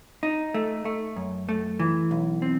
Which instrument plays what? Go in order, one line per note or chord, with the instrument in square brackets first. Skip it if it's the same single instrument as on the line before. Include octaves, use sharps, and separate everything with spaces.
[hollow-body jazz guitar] D#4
A3
A3
F#2
A3
E3
B1
C4